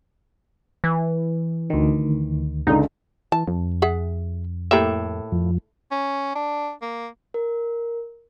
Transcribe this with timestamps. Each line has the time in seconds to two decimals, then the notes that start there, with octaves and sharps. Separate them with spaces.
0.84 E3
1.70 D2 D#3
2.67 C#2 D3 D#4
3.32 E3 A5
3.48 F2
3.82 G#4 E5 F#5
4.71 A2 A#3 G4 A4 E5
5.32 F2 F3
5.91 C#4
6.36 D4
6.82 A#3
7.34 A#4